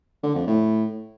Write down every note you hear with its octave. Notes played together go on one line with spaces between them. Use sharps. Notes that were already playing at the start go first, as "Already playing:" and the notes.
D3
F2
A2